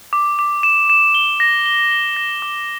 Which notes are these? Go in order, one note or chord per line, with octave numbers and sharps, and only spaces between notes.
D6
D6
E7
E7
G7
A#6
G7
G7
A#6
D6